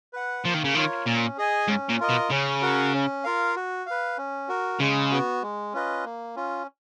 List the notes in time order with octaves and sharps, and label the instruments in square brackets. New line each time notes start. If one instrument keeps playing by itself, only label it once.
[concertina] B4 F#5
[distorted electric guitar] F3 [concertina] A#3
[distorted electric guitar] D#3
C#3
[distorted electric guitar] D#3 [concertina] F4 A#4 C#5
[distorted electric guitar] A#2 [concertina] C#4
[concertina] G#4 D#5 G#5
[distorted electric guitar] G#2 [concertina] C#4
[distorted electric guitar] A#2
[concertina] F4 A#4 D#5
[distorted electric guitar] B2
[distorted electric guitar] C#3 [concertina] C#4
[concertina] F#4 A#4
C#4
F4 A#4 F5
F#4
B4 F5
C#4
F#4 A#4
[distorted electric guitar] C#3 [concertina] G#3
[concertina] B3 F#4
G#3
C#4 F4 B4 D#5
A#3
C#4 F4